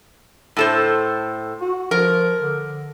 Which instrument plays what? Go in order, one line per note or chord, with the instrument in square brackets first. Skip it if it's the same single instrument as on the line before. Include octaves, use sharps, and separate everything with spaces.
[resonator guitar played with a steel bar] A2 A4 C5
[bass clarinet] F#4
[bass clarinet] F3 [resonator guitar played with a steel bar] A#4
[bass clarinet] D3